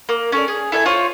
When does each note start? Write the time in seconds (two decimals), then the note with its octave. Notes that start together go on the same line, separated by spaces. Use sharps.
0.09 A#3
0.32 C#4 A4 D5
0.48 G#4
0.72 E4 A4 E5 G#5
0.86 F4 C5 C#5